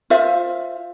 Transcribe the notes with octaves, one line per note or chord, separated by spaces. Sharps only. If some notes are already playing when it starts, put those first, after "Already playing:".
F4 C5 E5 F5